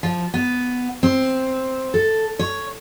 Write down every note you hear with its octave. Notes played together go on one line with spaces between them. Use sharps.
F3
B3
C4
A4
C#5